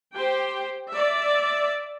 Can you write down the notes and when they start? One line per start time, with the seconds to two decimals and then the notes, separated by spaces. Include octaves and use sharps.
0.14 G4 C5 G5
0.89 D5 E5